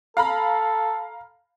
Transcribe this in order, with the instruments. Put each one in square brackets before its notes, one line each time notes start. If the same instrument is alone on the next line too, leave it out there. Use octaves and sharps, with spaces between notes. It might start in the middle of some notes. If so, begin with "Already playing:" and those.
[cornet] A4 [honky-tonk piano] F5 A#5 B5